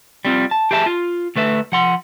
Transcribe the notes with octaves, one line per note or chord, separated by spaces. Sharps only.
G3 C4 F4
A5
G4 G#4 B4 E5 F5 A5
F4
D2 A3 B4 E5
F3 F#5 C6